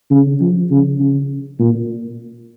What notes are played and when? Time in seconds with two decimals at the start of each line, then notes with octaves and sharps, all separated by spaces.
0.10 C#3
0.41 F3
0.70 C#3
0.99 C#3
1.59 A#2